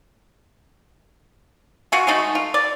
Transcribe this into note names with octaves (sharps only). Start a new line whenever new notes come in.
F4 F#4 G#5
G#3 A3 D#4 F#4
F4
D5